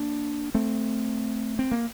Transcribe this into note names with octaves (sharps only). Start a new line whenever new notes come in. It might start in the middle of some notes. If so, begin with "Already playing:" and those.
Already playing: A#3 D4
A3 C4
C4
A#3